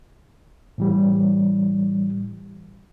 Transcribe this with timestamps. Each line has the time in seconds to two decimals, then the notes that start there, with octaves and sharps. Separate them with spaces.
0.78 A2 E3 G3